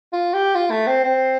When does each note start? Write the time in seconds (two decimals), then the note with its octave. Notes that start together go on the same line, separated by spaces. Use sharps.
0.13 F4
0.33 G4
0.55 F4
0.70 A3
0.87 C4
1.04 C4